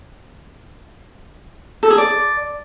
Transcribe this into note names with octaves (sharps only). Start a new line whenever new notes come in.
A4
G#4
D5